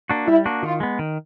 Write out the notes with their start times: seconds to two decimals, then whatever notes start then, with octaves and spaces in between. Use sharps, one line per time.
0.10 A#3 D4 F#4
0.27 G3 E4
0.46 A#3 D4 F#4
0.63 D#3 F4
0.80 G#3 B3
0.99 D#3